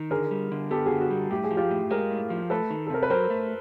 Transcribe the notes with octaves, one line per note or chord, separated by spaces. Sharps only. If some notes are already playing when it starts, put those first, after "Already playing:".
Already playing: D#3
D3 G#4 A#4
G3
D3
B3 G4 A4
F#4 G#4
D3
F#4
G3
A2 G4
G#4
F3
F4 G4
A2
G#3 G#4 A#4
A2
F3
A3 A4 B4
D#3
A4
C3 A#4
B4
F#3 A#4 C5
A3